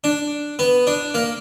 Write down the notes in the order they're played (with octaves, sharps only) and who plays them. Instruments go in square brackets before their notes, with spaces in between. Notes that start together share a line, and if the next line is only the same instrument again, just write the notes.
[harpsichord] D4
B3
D4
A#3